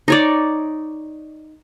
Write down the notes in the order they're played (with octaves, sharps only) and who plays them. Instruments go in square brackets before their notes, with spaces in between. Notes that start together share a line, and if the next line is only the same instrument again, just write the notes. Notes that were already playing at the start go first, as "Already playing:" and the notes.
[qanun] D#4 C#5 D5